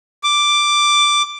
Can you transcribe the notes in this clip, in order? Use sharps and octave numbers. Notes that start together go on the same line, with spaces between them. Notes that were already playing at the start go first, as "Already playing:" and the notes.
D6